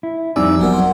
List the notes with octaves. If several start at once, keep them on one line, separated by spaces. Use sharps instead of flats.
E4
F2 G3 C4 D#4 D5 G#5 E6
G1 F#3 B3 F#4 A#4 F#5 G#5
F#5 C6